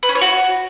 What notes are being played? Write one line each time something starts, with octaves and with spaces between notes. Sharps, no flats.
B4
C#4
C#5
F#4